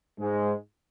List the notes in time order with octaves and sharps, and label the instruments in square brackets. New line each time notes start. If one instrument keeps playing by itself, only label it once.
[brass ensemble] G#2 G#3